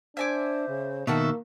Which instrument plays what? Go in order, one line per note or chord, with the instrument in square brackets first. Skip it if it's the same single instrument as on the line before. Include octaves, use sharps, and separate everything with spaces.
[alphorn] D4 [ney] C5 [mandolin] E5 G#5 D6
[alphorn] C#3
[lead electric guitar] B2 D#3 [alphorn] A#3 [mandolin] F#4 A4 E5